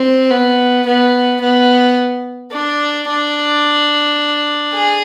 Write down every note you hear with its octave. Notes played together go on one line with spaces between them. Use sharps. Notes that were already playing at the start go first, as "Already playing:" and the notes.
Already playing: C4
B3
B3
B3
D4
D4
G#4